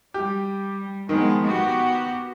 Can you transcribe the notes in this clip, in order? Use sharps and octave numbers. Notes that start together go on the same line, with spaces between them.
G3 G4
D#3 F3 G#3 B3
B3 F#4 G4